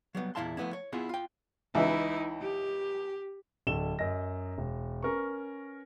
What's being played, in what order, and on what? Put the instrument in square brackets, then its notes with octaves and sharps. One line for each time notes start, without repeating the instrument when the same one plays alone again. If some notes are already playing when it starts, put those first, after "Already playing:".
[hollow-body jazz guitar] F#3 G3 B3
E2 A#2 E4 F5 A5 C6
F3 A3 B3 D4 E4
C#5
B3 E4 F4 G#4
F4 G5
[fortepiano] C#2 E3 E5 [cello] D#4 E4
[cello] G4
[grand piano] D1 D3 A4 E7 G7
F#2 D#5 A#6
E1
C#4 A#4 B4 C#6